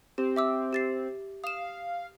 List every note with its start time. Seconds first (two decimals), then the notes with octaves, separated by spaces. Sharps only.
0.18 C4 G4
0.36 E5 D6 E6
0.73 G4 A6 C7
1.44 F5 D#6 E7